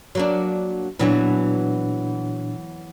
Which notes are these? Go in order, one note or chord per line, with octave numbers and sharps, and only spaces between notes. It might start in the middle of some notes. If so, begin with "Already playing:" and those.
F#3 A#3 D4
A#2 E3 F#3 B3 D4